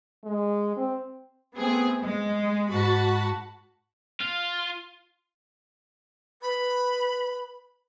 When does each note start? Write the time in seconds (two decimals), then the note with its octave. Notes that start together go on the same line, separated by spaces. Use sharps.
0.25 G#3
0.77 C4
1.56 A3 B3 C4 G#4
2.02 G#3
2.71 G#2 F#4 F#5 A5 B5
4.21 F4
6.42 B4 B5